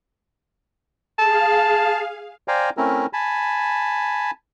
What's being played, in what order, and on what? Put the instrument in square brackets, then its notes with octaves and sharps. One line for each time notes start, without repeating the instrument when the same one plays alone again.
[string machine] G#4 F5 [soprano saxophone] A5
[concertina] C5 D5 F5 G5 G#5 A#5
A3 C4 C#4 E4 A#4
G#5 A5 B5